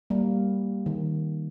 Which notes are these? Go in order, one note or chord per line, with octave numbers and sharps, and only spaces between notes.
G3 A#3
D#3